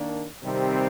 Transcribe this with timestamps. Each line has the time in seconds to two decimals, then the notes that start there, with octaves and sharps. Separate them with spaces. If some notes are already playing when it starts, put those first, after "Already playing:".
Already playing: D#3 A#3 D4
0.42 C3 D#3 G3 C4